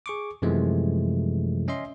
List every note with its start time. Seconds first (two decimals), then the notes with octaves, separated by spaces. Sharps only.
0.06 G#4 C#6 D6
0.42 F#2 C3 E3 F3 G#3 A3
1.68 C#4 D#5 E5 C6